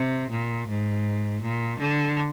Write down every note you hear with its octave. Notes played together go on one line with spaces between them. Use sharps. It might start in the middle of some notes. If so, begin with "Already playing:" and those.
Already playing: C3
A#2
G#2
A#2
D3